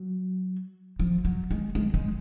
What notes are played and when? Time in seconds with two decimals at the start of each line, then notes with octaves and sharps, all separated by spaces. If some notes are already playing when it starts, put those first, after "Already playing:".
Already playing: F#3
1.00 F3
1.25 F#3
1.51 G#3
1.75 G#3
1.94 G#3